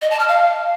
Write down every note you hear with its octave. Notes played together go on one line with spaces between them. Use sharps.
D#5
A5
F6
F5